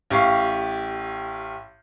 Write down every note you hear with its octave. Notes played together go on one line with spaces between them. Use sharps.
A1 G4 F5 C#6 C7